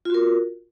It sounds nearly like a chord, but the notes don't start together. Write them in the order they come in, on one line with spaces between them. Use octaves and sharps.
F4 F#4 A#4